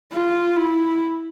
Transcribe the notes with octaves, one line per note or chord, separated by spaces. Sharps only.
F4
E4